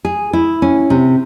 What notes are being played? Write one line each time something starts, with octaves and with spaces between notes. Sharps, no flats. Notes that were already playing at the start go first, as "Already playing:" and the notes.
G#4
E4
C#4
C3